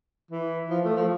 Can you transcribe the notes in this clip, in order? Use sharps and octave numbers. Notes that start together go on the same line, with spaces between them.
E3
F3
A3
F3